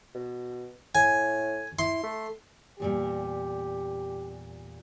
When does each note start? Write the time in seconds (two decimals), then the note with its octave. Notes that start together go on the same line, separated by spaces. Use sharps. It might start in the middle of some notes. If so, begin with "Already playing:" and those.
0.15 B2
0.95 A2 G#5
1.79 E4 C6
2.03 A3
2.80 E2 A#2 G3 G4